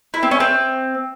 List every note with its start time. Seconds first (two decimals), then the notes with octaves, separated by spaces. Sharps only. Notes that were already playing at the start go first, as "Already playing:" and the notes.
0.14 E4
0.23 C4
0.31 C#4
0.40 C4